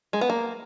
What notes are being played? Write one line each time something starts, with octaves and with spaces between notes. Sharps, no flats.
G#3
B3
A#3